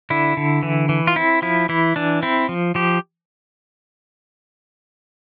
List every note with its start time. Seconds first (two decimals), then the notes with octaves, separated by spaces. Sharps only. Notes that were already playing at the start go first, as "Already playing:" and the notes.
0.10 D3 E4
0.37 D3
0.63 E3
0.89 E3
1.07 F4
1.16 C4 E4
1.42 F3 E4
1.69 E3 E4
1.96 E3 D4
2.23 C4 E4
2.49 F3
2.75 F3 G4